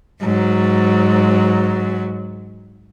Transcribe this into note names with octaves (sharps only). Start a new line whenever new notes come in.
G#2 F#3